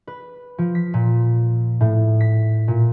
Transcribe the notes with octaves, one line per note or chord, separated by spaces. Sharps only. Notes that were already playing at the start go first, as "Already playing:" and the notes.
B4
F3
B6
A#2
A2
B6
A#2